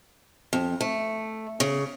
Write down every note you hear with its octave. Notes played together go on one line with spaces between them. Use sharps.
F2
A3
C#3